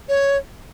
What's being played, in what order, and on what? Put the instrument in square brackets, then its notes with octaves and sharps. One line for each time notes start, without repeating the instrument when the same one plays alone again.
[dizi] C#5